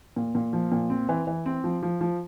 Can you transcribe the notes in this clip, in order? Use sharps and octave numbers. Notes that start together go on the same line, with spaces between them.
A#2
A#2
F3
A#2
C4
E3
E3
C4
F3
F3
F3